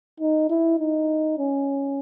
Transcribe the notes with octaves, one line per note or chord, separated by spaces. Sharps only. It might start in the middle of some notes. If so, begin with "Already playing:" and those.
D#4
E4
D#4
C#4